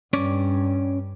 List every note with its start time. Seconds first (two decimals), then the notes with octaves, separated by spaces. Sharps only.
0.13 G2 C#4 C#5 D5